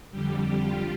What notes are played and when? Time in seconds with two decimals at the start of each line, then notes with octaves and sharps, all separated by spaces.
0.11 F2 D3 G3 G4
0.62 F4